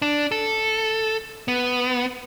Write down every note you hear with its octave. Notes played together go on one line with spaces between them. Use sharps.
D4
A4
B3